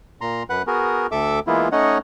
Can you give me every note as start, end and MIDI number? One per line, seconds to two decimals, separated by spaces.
0.21 0.43 46
0.21 0.43 82
0.21 0.43 84
0.50 0.62 42
0.50 0.62 71
0.50 0.62 78
0.50 0.62 90
0.67 1.07 59
0.67 1.07 66
0.67 1.07 68
0.67 1.07 70
1.12 1.40 38
1.12 1.40 69
1.12 1.40 76
1.12 1.40 86
1.12 1.40 88
1.47 1.68 52
1.47 1.68 56
1.47 1.68 58
1.47 1.68 59
1.47 1.68 64
1.47 1.68 65
1.72 1.98 57
1.72 1.98 61
1.72 1.98 63
1.72 1.98 73
1.72 1.98 75
1.72 1.98 78